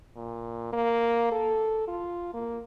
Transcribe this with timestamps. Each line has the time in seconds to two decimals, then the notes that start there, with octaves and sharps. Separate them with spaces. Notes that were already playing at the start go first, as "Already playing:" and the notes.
0.16 A#2
0.73 A#3
1.32 A4
1.87 F4
2.34 A#3